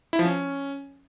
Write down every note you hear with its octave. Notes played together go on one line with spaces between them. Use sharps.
E4
F3
C#4